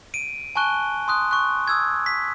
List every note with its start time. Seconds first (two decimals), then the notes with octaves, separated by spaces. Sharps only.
0.14 D7 D#7
0.56 G#5 A5 C#6 F#6 G7
1.08 C6 D#6 F#6
1.31 C#6 F#6
1.68 D#6 E6 G#6
2.06 B6